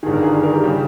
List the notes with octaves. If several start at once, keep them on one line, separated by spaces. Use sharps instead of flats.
G1 G2 D#3 G#4
A#4
G#4
G#4
A#4
G4
C#3 G3 G4